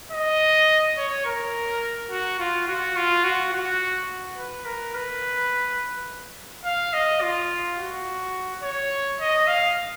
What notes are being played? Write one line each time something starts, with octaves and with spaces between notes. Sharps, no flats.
D#5
C#5
A#4
F#4
F4
F#4
F4
F#4
F#4
B4
A#4
B4
F5
D#5
F4
F#4
C#5
D#5
F5